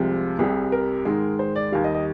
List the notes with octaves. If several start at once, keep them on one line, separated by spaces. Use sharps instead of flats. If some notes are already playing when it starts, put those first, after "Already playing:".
Already playing: C2 C3 F3 G#3
C2 C3 G3 G#4
A#4
G#2 D#3 G#3
C5
D5
D#2 D#3 G3 F5
D#5
D#5